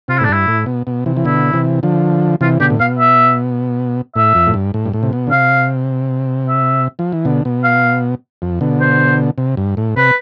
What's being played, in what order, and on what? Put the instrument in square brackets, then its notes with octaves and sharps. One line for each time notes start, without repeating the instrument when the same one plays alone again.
[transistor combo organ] C3 [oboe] F4
[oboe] E4
[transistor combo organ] A2
[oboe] D4
[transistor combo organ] G2 [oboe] E4
[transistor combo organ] A2
B2
B2
C3 E3
E3
[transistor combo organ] B2 D3 [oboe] E4
[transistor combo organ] C3 E3
D3 F3
[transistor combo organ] C3 E3 [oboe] F4
[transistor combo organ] B2 D3 [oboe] G4
[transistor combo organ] A2
[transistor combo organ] B2 [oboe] F5
[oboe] E5
[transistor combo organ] A2 [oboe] E5
[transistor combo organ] F2
A2
G2
A2
G2
A2
C3
B2
D3
[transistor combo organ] C3 [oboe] F5
[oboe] E5
[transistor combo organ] F3
E3
B2 D3
B2
[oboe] F5
[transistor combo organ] F2
B2 D3
[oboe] C5
[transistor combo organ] C3
G2
A2
[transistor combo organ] C3 [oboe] B4